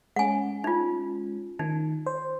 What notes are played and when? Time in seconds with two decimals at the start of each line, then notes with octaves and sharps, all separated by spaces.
0.16 G#3 C#4 F#5 G#5
0.64 D#4 F4
1.59 D#3 D#4
2.06 C5